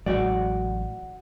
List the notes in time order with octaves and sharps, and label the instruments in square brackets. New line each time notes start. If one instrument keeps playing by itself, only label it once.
[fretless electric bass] A1 F#3 G#3 [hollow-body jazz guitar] F#4 D5